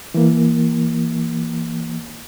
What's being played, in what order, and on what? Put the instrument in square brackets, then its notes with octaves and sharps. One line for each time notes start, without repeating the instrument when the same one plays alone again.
[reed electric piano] E3 A#3